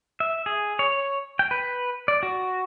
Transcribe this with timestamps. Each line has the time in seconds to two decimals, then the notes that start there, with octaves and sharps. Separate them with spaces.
0.20 E5
0.46 G#4
0.79 C#5
1.39 G5
1.51 B4
2.08 D5
2.23 F#4